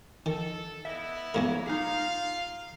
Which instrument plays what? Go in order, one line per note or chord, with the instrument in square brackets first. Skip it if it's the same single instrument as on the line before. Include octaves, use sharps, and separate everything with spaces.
[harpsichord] D#3 [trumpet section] A4
[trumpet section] B3 E4 [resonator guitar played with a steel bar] D#5 E5
[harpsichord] B1 G#2 A#4 [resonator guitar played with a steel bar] A#3 F#4 C#5
[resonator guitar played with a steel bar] D#4 G#4 [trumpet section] F4 F5